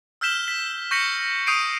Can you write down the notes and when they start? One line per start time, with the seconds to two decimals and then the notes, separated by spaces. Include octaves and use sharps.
0.21 E6 F6 G6 B6 E7 G7
0.48 B6
0.91 C#6 G6 A#6 B6 C#7 F#7
1.46 C#6 D#6 G6 C7 D7 D#7